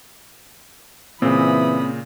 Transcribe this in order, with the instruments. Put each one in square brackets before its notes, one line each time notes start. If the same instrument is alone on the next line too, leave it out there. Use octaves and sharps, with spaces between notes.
[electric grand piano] A#2 C#3 [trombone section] E3 [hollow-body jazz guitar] C4 [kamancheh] B5 D#6